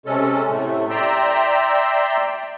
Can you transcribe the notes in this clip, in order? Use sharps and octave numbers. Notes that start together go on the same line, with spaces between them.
C3 G#3 C#4 A4
A2 C3 A3
D5 E5 G5 A#5 C6 E6